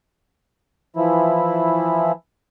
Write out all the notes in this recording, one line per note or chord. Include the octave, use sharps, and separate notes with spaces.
E3 F3 E4